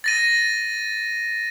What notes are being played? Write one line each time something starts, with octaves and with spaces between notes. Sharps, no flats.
A6 A#6 D#7